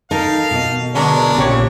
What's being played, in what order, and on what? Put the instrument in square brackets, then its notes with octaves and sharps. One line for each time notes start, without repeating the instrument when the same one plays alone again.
[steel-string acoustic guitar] D#4 [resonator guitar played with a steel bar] A4 A#4 [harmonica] F5
[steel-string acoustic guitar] B2 D#5
[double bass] D3 [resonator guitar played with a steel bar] F#3 G#3 B3 [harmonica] D4 A#4
[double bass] A#1 [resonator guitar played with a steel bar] C#3 G4 C#5